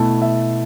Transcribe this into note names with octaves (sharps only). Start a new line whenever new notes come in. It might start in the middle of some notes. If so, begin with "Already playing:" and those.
Already playing: B2 A3 E4 A5
E5